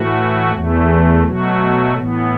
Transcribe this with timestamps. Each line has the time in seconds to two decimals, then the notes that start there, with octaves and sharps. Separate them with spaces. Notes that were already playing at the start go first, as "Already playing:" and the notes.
Already playing: A2 E3 A3 F#4
0.53 E2 E3 A3
1.24 B2 F#3 A3 F#4
1.95 A2 E3 B3